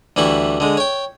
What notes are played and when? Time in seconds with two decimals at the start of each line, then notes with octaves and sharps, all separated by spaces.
0.16 D2 E3 G3 E4 C#6
0.60 D3 G#3
0.77 C#5 G5